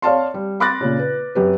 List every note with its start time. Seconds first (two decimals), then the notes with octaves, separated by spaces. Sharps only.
0.02 C#5 D5 F5 A5 C6
0.34 G3
0.60 B5 C6 D6 F#6 A6 A#6
0.81 A#2 C#3
0.99 B4
1.35 F#2 G4 B4